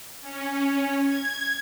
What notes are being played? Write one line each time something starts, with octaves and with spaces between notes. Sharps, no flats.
C#4
G#6